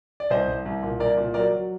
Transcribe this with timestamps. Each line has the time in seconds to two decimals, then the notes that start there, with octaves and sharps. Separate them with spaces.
0.20 D5
0.30 C2 C5 D#5
0.48 C2
0.65 C2
0.83 A#2
1.00 C2 A#4 D5
1.17 A#2
1.34 F#3 A#4 D5
1.52 F#3